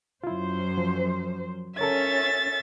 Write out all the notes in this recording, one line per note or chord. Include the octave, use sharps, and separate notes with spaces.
F#2 E4 F4 C5
F3
C#4 A4 A#4 C#5 E5 A6